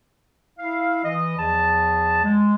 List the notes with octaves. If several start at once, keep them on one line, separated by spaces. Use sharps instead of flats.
E4 F5
E3 D#5
E2 F3 G#4 A5
G#3